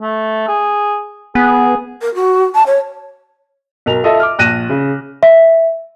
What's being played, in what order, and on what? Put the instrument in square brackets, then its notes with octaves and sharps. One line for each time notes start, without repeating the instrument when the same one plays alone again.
[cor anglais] A3
G#4
[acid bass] B3 [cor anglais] G#4
[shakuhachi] A#4
F#4
A5
C#5
[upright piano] B1 A#4 F7
F4 A4 D#5 E5
D6 F6
A#1 F#6 A#6 D#7 E7
C#3
[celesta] E5